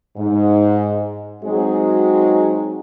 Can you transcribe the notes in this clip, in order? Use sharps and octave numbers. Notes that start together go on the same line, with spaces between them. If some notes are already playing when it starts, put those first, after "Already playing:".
G#2
F#3 G#3 C4 D#4 F#4 G#4